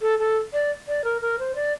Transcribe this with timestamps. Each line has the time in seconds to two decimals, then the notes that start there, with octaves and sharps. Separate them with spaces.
0.02 A4
0.19 A4
0.53 D5
0.88 D5
1.04 A#4
1.21 A#4
1.39 C5
1.55 D5